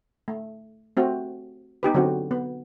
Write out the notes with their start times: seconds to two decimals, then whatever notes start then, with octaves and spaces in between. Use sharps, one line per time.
0.28 A3
0.97 A3 C4 F#4
1.83 B3 D#4 G4 B4
1.94 D3 F#3 C4 F#4
2.31 B3